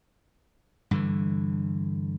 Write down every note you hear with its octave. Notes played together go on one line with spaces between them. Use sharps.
G2 D3 E3